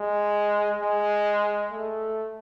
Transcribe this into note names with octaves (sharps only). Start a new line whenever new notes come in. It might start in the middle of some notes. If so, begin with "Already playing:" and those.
Already playing: G#3
G#3
A3